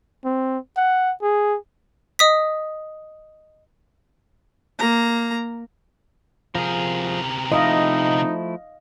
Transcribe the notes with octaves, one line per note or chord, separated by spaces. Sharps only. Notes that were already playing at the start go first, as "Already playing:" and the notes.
C4
F#5
G#4
D#5 D#6 B6
A#3 A#5
C3 F3 G#4 A#4
F3 A3 D#4 E4 D#5 F5